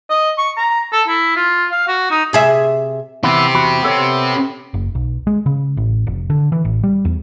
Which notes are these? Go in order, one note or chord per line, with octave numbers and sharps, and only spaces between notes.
D#5
C#6
A#5
A4
E4
F4
F5
F#4
D#4
C3 G#4 E5
E3 B3 C4 E4 G4
E2 F#4 B5
B3 A4 C#5
F#1
B1
G#3
C#3
A1
F1
D3
E3
A1
G3
E2